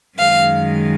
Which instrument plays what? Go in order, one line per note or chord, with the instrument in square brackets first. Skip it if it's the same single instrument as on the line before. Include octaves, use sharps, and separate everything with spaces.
[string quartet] F#2 D#3 G#3 F5